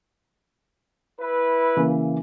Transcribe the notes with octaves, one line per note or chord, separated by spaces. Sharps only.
E4 B4
C#3 E3 A#3